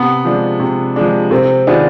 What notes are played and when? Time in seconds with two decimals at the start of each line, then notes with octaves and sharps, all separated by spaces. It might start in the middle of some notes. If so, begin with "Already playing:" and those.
Already playing: C3 B3
0.24 F3 G#3 D4
0.60 C3
0.96 F3 G#3 D4
1.31 C3 C4
1.67 D#3 B3 D4 F4 G#4